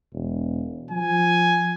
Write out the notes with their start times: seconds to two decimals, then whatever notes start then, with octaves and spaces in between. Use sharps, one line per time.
0.14 E1
0.91 F3 G#5